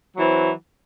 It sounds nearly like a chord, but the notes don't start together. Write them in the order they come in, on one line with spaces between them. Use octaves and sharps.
F#3 E3 C4